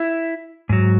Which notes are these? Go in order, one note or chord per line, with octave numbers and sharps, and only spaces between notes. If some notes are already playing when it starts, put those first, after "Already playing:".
Already playing: E4
G#2 F#3